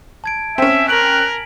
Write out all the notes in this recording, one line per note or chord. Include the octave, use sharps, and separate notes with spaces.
A5 G#6 D7
C4 C#4 E5 G#5
A#4 F#6 B6 D7 F#7